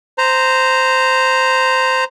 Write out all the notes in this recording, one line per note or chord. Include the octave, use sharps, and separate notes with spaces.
C5 A#5